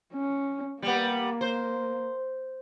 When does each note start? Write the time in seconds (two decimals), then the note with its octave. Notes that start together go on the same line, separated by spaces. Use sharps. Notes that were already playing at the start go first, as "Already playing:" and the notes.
0.14 C#4
0.82 G3 A#3 B3
1.41 C5